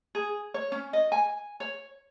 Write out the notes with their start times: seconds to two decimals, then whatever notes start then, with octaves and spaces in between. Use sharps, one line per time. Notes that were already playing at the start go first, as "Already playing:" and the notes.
0.15 G#4
0.54 C#5
0.72 C#4
0.93 D#5
1.12 G#5
1.60 C#5